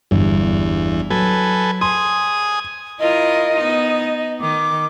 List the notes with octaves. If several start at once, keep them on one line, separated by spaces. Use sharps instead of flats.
G1 E2
F#3 A4 B4 G#5
G#5 C6 D#6
E4 F4 A#4 D#5
B3 D#4
D#3 D6